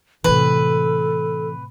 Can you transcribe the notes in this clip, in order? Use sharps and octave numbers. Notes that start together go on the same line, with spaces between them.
A2 C3 E3 A4 B4